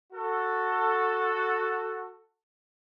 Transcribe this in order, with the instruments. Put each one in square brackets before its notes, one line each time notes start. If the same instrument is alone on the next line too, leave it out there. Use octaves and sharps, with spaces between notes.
[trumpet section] F#4 A4